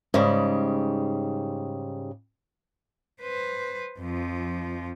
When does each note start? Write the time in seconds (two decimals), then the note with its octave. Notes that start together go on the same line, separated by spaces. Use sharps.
0.14 G#2 C#3 G3
3.22 B4 C5
3.99 F2 F3